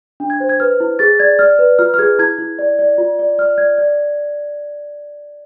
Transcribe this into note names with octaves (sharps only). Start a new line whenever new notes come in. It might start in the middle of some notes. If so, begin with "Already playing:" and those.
D4
G#6
C5
G#6
B4 F6
E4
G#4 A6
D5 G#6
D5 F6
B4
F4 F6
F6
G#4 G#6
E4 G#6
E4
D5
D5
F4
D5
D5 F6
D5 G#6
D5